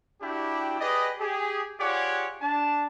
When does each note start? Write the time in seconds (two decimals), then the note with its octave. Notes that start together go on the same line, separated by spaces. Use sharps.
0.21 D4 E4 F#4 G4
0.80 G4 G#4 B4 D5 D#5
1.20 G4 G#4
1.80 F4 G4 G#4 C#5 D5 F#5
2.42 D4 A5